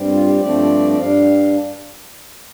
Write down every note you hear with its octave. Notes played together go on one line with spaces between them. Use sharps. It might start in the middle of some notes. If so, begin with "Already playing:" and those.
Already playing: G2 G3 C4
F4
G4
G2 F3 A3 C4 D5
D5
G2 G3 D4 F5